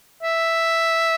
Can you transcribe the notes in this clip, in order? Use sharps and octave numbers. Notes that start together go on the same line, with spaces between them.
E5